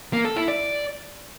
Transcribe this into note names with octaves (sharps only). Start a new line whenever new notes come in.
A#3
A4
E4
D5